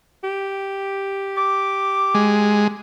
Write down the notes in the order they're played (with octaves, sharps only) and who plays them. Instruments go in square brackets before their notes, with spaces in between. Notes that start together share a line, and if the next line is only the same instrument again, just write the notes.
[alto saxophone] G4
[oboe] D6
[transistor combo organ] G#3